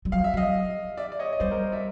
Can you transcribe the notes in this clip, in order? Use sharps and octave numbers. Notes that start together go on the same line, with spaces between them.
G3
F#3 F5
E5
F#3
D#5 F5
D5 E5
D5
C#5 D#5
D#5
G3 C5 D5
A#4 C5
D5 E5